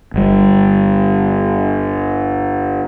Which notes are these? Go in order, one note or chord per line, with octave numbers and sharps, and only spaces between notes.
G1 G3